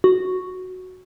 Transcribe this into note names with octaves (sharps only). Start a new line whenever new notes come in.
F#4